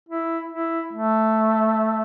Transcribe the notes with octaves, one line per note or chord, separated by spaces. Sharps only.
E4
E4
A3